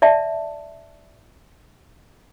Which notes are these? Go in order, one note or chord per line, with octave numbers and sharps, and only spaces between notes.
D5 E5 A5